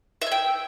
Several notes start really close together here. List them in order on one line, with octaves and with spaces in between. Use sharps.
E5 G#5 G5